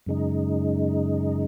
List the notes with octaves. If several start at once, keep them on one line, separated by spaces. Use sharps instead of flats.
F#2 C#3 G#3 D#4